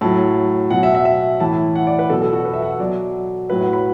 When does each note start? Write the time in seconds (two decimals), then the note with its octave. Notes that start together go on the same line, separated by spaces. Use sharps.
0.01 A2 F#3 A5
0.70 B2 F#3 F#5
0.83 E5
0.95 E5
1.05 E5
1.40 A2 E3 A5
1.76 F#5
1.87 D5
1.99 B4
2.10 B2 F#3 A4
2.22 A4
2.33 F#4
2.45 B4
2.54 E5
2.62 F#5
2.71 E5
2.80 B2 F#3 D5
3.50 A2 F#3 B4
3.61 F#5
3.73 B5